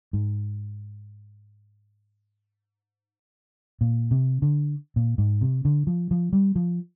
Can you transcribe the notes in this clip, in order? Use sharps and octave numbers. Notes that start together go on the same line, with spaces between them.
G#2
A#2
C3
D3
A#2
G#2
C3
D3
F3
F3
G3
F3